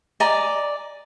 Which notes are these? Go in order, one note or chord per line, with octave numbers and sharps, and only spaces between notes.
D5 D#5 G#5 A#5